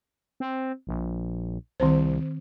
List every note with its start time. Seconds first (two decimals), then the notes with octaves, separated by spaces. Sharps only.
0.40 C4
0.87 A#1
1.80 C2 D#3 C4 C5